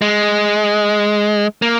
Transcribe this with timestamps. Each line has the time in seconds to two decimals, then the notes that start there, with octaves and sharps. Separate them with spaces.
0.02 G#3
1.62 A#3